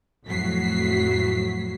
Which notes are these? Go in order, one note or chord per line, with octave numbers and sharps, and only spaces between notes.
F2 A2 F#3 F#4 B6 C7